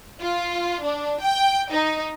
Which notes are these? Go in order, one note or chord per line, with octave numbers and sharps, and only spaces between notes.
F4
D4
G5
D#4